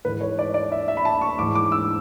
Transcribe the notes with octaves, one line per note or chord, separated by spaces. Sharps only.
G#2 E3 B4
C#5
D5
D5
E5
E5
B5
A5
C#6
G#2 E3 D6
D6
E6